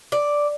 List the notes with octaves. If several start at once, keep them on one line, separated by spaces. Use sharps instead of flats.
D5